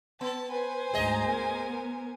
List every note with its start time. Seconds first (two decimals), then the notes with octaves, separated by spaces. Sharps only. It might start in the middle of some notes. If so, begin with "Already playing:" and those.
0.21 B3 A5
0.51 B4 C5 G#5
0.94 D2 G#2 G#4 D#5 A#5
1.28 B3 A#4